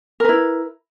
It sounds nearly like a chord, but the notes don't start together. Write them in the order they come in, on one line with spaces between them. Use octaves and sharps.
A#4 B4 E4